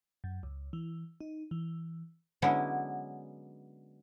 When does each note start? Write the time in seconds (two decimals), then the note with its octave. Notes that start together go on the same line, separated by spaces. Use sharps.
0.24 F#2
0.43 C#2
0.73 E3
1.21 D#4
1.51 E3
2.42 D3 F#3 G#3 B3 C#4 E4